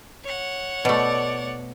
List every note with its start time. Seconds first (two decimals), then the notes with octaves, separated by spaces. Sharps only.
0.24 C#5 F#5
0.85 B2 A3 D5